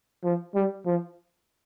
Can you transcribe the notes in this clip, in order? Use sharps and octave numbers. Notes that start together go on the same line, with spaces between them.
F3
G3
F3